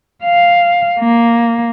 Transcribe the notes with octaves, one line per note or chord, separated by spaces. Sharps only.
F5
A#3